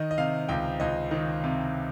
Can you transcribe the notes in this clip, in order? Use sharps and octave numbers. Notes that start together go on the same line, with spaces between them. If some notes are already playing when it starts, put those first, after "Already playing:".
Already playing: D#3 D#5
D#5
C3 F5
C#2 G5
C#2 D#5
D#3
C3